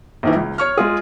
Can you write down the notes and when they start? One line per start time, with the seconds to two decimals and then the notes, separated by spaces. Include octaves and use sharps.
0.23 A#1 D#3 E3
0.36 C#2
0.58 C#5 C#6 F6
0.77 G#3 F4 G#4